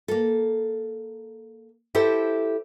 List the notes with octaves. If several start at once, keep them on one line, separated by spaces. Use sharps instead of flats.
A#3 A4
E4 G4 A4 C5